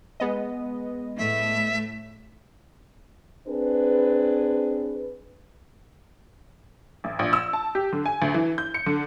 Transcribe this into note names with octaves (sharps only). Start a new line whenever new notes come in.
G#3 B3 D#5
A2 A3 E5
C4 D4 G#4 B4
A1
A#1
E6
A5
G4
D3
G#5
D2
E3
G6
C#7
D3